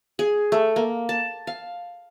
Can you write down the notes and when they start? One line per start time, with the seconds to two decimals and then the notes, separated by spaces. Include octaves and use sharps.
0.19 G#4
0.52 A3
0.76 A#3
1.09 A5
1.47 F5